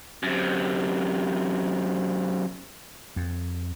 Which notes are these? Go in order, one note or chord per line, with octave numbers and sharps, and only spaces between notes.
F#2 C3
F2